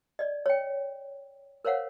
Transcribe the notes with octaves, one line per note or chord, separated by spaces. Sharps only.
D5 D#5
C#5 G5
A#4 C5 C#5 F5 F#5